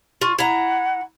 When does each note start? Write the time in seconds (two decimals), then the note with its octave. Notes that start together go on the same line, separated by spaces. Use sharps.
0.21 F4 C#6
0.39 E4 F#5 A#5